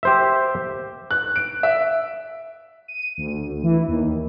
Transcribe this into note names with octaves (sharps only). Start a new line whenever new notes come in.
G4 C5 E5
F#6
D7
E5
D#7
D2
E3
D#2